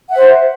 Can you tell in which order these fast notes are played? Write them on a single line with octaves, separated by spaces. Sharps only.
F#5 E5 C5